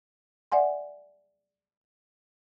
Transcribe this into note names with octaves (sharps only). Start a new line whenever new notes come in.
D5 E5 F#5 G#5 C6